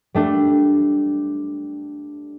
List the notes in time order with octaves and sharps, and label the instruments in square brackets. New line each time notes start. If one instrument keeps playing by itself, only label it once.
[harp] G3 A3 D4